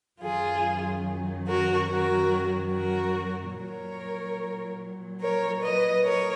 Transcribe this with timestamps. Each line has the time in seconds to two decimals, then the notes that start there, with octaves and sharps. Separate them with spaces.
0.21 F#2 D#3 F#3 F4 G#4
1.46 F#4 A#4
1.88 F#4 A#4
2.71 F#4 A#4
3.54 A#2 F#3 A#4 C#5
5.21 A#4 C#5
5.62 B4 D#5
6.03 A#4 C#5